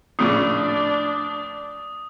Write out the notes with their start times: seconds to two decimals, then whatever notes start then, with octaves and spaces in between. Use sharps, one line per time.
0.19 A#1 A2 C#3 D4 D5 D#6